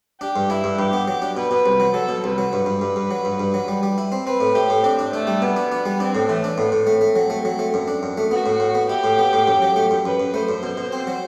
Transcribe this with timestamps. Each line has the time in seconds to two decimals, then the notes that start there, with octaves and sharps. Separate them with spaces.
0.21 D4 G4
0.36 G2
0.50 D4 E4
0.64 G2
0.79 G2 G4
0.93 B3
1.08 F#3
1.22 D4
1.37 B2 B4
1.51 B2
1.66 C2
1.80 F#3
1.94 F#3 A4
2.09 B2
2.23 C2 B4
2.38 F#3
2.52 G2 B4
2.66 G2
2.81 G2
2.96 G2
3.11 F#3
3.25 G2
3.39 G2
3.54 F#3
3.68 G3
3.83 G3
3.98 E4
4.12 C4
4.26 C4 B4
4.41 A2
4.55 E4 G4
4.70 A2
4.84 C4 D4
4.99 D4
5.13 A3 D4
5.27 G3
5.42 B2 B3
5.56 D4
5.72 D4
5.86 G3
6.00 C4 D4
6.15 A2
6.28 E3 A3
6.44 D4
6.57 A2 B3
6.72 A2
6.86 A3 C4
7.01 A3
7.16 F#3
7.30 A3
7.45 F#3
7.59 A3
7.74 F#2
7.88 D4
8.03 F#2
8.18 A3
8.31 B3 F#4
8.46 A2
8.60 A2
8.75 B3
8.89 E4 G4
9.04 A2
9.19 B3
9.33 A2
9.48 F#2
9.62 F#3
9.76 A3
9.91 F#2
10.05 F#2 B4
10.20 F#2
10.34 A3 C5
10.49 F#2
10.63 B2
10.77 B2
10.92 C4
11.07 F#3